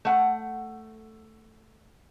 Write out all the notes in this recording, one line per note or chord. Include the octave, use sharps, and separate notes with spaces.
A3 F#5